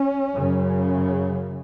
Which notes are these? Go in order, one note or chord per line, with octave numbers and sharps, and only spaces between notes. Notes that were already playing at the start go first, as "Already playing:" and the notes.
Already playing: C#4
F#2 C#3